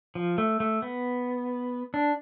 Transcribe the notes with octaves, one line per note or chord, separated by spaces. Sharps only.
F3
A3
A3
B3
D4